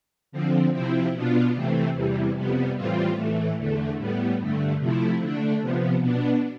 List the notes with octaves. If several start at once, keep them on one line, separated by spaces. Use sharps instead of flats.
D3 F3 C4
C3 F3 C4 E4
B2 B3 D4 F4
C3 E3 A3 C4
E2 C3 E3 G3
F2 C3 G3 B3
A2 E3 G3 C4 F4
A2 E3 A3
E2 D3 A3
A2 G3 B3
G2 D3 A3
C3 F3 A3 E4
D3 A3 D4
C3 F3 B3
B2 B3 D4